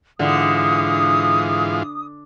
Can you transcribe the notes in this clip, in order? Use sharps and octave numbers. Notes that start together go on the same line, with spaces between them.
G#2 D3 E3 F4 D#6